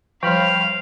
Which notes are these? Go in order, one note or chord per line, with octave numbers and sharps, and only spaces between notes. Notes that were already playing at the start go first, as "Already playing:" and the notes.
F3 G3 F5 G5 B5 F6